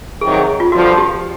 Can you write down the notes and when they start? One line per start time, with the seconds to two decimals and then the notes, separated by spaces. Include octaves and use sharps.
0.21 C3 D#3 F#3 G#4
0.34 G#4
0.60 F4
0.72 G2 D3 F3 F#4
0.98 G4